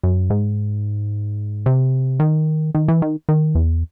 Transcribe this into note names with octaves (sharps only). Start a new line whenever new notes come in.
F#2
G#2
C3
D#3
D#3
E3
D#3
D#3
E2